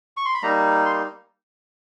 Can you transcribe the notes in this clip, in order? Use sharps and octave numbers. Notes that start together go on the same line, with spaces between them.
C#6
C6
B5
G3 A#3 D#4 A#5
C6